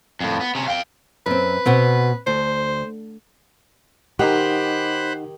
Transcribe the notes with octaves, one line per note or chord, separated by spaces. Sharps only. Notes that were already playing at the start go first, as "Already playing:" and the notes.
F2 A2
B3
C3 C#4
F5 G5
F#2 C4 B4
B2 B3 C4
D2 C5
D#3 D#4 G4 C5 D#5 F#5 B5 F#6